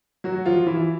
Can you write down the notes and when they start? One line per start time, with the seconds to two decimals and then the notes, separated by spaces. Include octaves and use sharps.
0.24 F#3 F#4
0.45 F3 F4
0.66 E3 E4